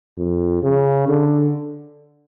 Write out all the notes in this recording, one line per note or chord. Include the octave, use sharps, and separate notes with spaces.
F2
C#3
D3